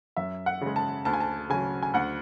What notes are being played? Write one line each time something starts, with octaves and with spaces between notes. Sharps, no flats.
F#2 E5
F#5
C#3 G#3
A5
D2 A5
G#5
A5
C#3 F#3 G#5
G#5
D2 F#5